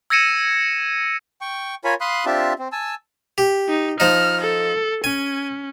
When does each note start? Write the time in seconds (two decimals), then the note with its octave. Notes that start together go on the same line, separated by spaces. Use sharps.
0.10 E6 G#6 A#6 C#7 D#7 E7
1.41 G5 C#6
1.84 F4 A#4 C#5 G#5 B5
2.01 F5 B5 C6 D#6 F#6
2.26 C4 D4 F4 G4 E5 A5
2.59 C4
2.72 G#5 A5 E6
3.38 G4
3.69 D#4
4.00 F3 D#4 F6
4.42 A4
5.04 C#4 G#5